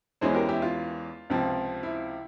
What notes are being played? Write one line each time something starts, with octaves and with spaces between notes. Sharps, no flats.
E2 E3 G#3 C#4 G#4 C5
G4 A#4
E4 G4
F4
C#2 C3 F3
E4